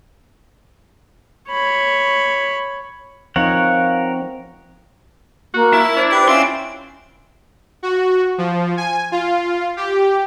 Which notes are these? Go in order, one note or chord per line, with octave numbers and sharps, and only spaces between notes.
C#5 B5
F3 C4 D#4 A#4 C#5 D#5 F5 F#5
A#3 F#4
E4 A5
D4 C5
G4 B4
C#4 E4 F4 G5 C6 E6
F#4
F3
G#5
F4
G4